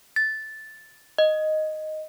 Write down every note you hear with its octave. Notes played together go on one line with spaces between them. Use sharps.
A6
D#5